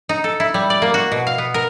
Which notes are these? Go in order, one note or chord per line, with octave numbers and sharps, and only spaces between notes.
D#4
A4
E4
G3
D5
A#3
F#4
B2
F5
B3
A#4